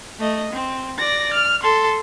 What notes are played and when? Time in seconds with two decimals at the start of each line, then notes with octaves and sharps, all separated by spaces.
0.20 A3 D#5
0.53 C4
0.98 D5 A#6
1.34 F6
1.63 A4 C6